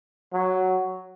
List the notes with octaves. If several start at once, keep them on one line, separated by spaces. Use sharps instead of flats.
F#3